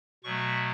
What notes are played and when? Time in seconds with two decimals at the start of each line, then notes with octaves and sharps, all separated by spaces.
0.24 B2 F#3 A3 C#6